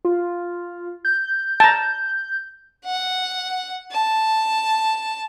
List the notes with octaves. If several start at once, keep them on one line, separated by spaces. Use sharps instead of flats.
F4
G6
A5 A#5
F#5
A5